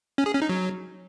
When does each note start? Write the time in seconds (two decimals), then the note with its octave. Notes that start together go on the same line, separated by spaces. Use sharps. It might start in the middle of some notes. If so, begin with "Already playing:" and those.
0.18 C#4
0.26 G#4
0.34 C#4
0.42 D#4
0.49 F#3